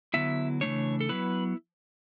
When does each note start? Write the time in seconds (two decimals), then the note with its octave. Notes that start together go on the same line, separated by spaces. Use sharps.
0.14 D3 F#3 B3 E4 E5
0.61 C#3 E3 A3 D4 C#5
1.00 A4
1.09 F#3 B3 E4 B4